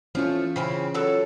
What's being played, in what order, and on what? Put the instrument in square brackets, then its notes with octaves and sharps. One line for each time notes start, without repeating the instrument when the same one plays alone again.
[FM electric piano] E3 C#4 F4 [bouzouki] F3 A3
[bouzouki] C#3 C4 E4
F#3 A4 A5